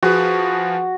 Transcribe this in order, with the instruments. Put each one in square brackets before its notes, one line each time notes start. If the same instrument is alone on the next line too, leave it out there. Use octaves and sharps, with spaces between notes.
[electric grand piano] F3 G#4 B4 [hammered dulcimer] F#4